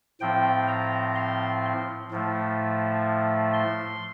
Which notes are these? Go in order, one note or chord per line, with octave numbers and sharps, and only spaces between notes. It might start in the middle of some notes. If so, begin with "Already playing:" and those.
A2 F3 C4 G5
A#5
C6
A2 F3 A3
C6